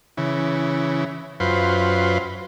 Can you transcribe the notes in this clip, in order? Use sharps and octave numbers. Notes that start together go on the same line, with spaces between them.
C#3 E3
F#2 F4 B4 C5